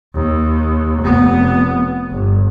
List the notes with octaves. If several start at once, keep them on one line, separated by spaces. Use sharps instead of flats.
D#2
F1 B3
G1